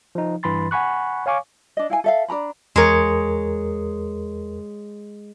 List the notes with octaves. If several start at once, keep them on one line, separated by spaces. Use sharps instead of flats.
F3 D#4
G2 E3 B5 C6 A6
F#5 G#5 B5 C#6 F#6
C#5 F5 G#5 C#6 D6
D4 D#5
E4 F5 G#5
A4 E5 F5
D4 A#4 A#5 B5
E2 G#3 A#4 C#5